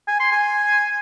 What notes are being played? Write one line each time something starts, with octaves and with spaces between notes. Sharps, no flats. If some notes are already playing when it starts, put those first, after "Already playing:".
G#5
C6
G#5